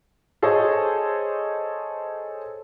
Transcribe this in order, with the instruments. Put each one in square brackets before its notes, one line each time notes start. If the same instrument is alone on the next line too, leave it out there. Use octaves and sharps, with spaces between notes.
[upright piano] G#4 A4 C5 C#5 D#5